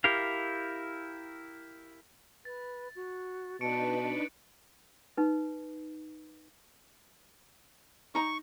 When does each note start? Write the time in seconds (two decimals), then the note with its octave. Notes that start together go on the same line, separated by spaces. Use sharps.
0.04 E4 G4 A#4 F5
2.45 B4 A6
2.95 F#4
3.61 B2 D4 D#4 B4 A5 C#6 C#7 D7
5.17 D#4 B4
8.15 D#4 A#5 C#6